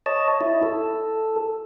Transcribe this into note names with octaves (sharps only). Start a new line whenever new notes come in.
C#5 D#5 A5
E4
A4